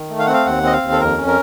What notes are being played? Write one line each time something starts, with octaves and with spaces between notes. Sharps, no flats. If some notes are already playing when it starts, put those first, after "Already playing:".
Already playing: D#3
A3
F5
C4 F#5
F5
D#2 F#5
C4 D#5
F5
D#2
A4
F2 A#4
C#4
A#4